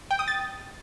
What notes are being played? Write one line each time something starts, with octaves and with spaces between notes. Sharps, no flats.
G5
D#6
A6